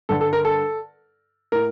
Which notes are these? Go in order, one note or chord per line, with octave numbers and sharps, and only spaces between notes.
G2 D3 A4
A4
A#4
A4
A2 A#4